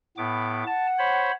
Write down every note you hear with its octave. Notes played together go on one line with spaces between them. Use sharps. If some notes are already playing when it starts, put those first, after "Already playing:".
A2 B3 D6
F#5 A5
C5 C#5 B5